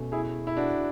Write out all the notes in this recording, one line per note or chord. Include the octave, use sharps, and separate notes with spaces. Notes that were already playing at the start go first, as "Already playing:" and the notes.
Already playing: B2 A3 C#4
E4 G#4
E4
D4 F#4